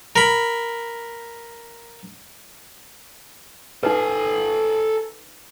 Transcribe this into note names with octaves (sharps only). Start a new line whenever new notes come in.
A#4 B5
D#4 A4 B4 G#5